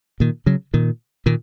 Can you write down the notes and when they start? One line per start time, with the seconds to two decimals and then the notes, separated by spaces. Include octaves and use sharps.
0.20 A#2 D#3
0.46 C#3 F#3
0.74 A#2 D#3
1.26 A#2 D#3